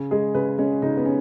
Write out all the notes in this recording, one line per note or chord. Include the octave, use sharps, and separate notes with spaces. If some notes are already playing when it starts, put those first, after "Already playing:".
Already playing: C#3
G#3 G#4
C#3 B4
G#3 C#4
C#3 D#4
B3
C#4